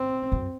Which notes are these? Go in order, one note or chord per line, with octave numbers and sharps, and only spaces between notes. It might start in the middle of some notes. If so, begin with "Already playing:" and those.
Already playing: C4
F#2